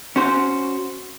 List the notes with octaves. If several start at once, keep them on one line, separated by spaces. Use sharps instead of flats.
C#4 F#4 C5